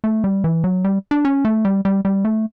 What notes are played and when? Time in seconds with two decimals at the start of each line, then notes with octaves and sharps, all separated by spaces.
0.04 A3
0.24 G3
0.44 E3
0.64 F#3
0.84 G3
1.11 D4
1.25 C#4
1.45 A3
1.65 G3
1.85 G3
2.05 G3
2.25 A3